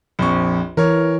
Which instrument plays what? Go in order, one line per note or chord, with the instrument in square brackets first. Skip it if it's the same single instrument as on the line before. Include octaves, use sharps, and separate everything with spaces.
[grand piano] A#1 F2 C#6
[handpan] E3 [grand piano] A#4 C#5